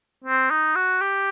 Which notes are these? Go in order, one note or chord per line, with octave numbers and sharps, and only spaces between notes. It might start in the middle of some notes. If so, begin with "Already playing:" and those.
C4
D#4
F#4
G4